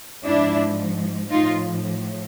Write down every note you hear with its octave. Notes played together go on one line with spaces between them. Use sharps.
G#2 F3 D4 E4
A2 F3 D#4 F4